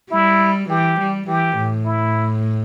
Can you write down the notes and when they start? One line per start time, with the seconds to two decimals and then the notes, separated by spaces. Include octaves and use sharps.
0.11 G3 E4
0.69 E3 G4
0.99 G3
1.27 E3 G4
1.57 A2
1.85 E4